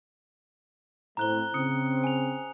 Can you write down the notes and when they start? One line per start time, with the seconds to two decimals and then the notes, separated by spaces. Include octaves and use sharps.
1.17 A2 A3 C4 A#5 F#6 G7
1.54 C#3 C4 D#6 C#7
2.04 G#5 F7